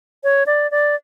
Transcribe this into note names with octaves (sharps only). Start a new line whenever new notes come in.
C#5
D5
D5